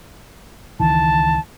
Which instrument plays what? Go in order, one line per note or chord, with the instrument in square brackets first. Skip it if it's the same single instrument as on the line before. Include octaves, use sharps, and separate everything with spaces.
[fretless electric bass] C#2 D#3 E3 [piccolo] A5